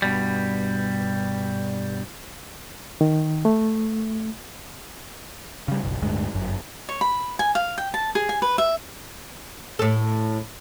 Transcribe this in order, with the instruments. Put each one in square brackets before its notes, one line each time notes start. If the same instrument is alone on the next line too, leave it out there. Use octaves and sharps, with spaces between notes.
[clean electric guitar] G2 B2 G3
[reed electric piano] D#3
A3
[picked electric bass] C#3 G3
F#1 B1
D1 D2 G2 G#3
G1 F#2
[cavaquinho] C#5
B5
G#5
F5
G5
A5
G#4
G#5
B4
E5
[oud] A2 A4